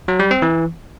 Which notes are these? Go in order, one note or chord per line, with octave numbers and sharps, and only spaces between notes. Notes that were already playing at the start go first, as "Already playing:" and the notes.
F#3
G3
C4
E3